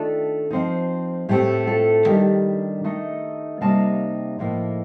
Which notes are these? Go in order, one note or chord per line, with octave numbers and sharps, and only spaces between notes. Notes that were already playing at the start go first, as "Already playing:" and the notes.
Already playing: D#3 A3 D4 F4 A4
F3 C4 D#4
A2 A3 C4 G4
F4 A4
D#3 G3 D4 G4 A#4
D#3 A3 D#4
C3 G3 A#3 D#4 F5 A5
A2 F3 A#3 D#4